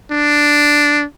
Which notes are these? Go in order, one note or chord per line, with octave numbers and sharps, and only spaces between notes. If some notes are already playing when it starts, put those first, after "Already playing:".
D4